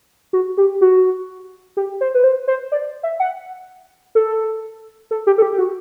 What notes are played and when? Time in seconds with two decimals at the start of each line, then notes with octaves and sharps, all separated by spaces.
0.33 F#4
0.57 G4
0.81 F#4
1.77 G4
2.01 C5
2.15 B4
2.24 C5
2.48 C5
2.72 D5
3.03 E5
3.20 F#5
4.15 A4
5.11 A4
5.27 G4
5.38 A4
5.42 G4
5.53 G4
5.58 F#4